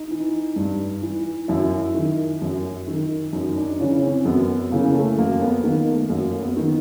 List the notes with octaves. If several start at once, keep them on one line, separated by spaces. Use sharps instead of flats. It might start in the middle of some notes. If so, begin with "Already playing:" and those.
Already playing: D#4
E3
G2
E3
F#2 E4
D#3
F#2
D#3
F#2 D#4
D4
C#3 E3 C#4
C4
F#2 B3
C#3 E3 A#3
A3
F#2 A#3
B3
D#3 A#3
A3
F#2 A#3
B3
D#3